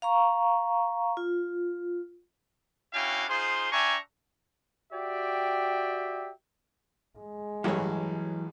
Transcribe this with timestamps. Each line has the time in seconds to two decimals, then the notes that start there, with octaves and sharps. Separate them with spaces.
0.02 F5 A#5 C#6
1.17 F4
2.93 C#4 D4 E4 F#4 F5 G5
3.29 D#4 F4 G#4 C5 C6
3.72 D4 E5 G5 G#5 A#5 C#6
4.92 F#4 G4 D5 E5 G5
7.19 G#3
7.64 A1 G2 E3 F#3 C#5